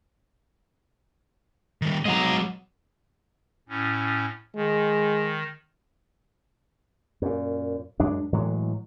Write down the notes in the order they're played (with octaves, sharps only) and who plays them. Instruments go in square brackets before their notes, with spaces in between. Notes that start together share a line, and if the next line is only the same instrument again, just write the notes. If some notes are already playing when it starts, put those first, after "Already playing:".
[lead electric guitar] D#3 G3
[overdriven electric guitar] F#3 D#5 [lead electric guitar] G#3 A#5
[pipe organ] A2 C#4
[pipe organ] D#3 [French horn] G#3
[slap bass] F#2 A#2
F#2 F#3 G#3 D4
A2 E3 F#3 G#3